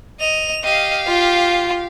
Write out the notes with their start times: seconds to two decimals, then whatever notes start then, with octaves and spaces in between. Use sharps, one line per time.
0.21 D#5 F7
0.64 G4 D#5 F5
1.08 F4